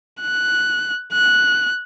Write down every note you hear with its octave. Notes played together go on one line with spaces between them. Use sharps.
F#6
F#6